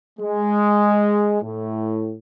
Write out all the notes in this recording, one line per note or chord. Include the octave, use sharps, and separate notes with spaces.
G#3
A2